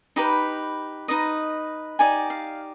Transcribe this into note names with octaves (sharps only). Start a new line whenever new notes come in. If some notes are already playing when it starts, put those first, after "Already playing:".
D#4 G4 B4 B5
D#4 B4 D#5
D#4 G4 D5 G#5
F5